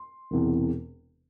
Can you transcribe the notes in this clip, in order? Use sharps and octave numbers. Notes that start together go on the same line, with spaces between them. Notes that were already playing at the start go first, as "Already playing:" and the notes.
Already playing: C6
E1 E2 C3 E3